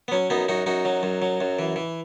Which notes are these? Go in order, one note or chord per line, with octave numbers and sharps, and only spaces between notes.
B3
F#3 C#4
F#2 B3 D#4
F#2 D#4 F#4
F#2 D#4 F#4
F#3
F#2
F#3
F#2
E3
E3